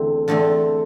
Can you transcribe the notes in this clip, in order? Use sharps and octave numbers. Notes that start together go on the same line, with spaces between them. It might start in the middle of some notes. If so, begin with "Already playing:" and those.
Already playing: E2 D3 A3 C4
E2 D3 A3 C4